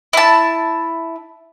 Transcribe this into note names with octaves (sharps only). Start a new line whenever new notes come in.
E4 A5